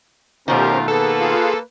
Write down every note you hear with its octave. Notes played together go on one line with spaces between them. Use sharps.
B2 D#3 A3 C#4 F4 G4 A#4 C5
A#3 G#4 A4 B4
F4 G#4 F5